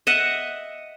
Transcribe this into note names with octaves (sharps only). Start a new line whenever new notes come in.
D#5 E5 F#5